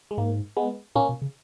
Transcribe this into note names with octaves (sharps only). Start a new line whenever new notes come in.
G#3
G#2 A#3
G#3 B3
A#2 A#3 C#4
B2
C#3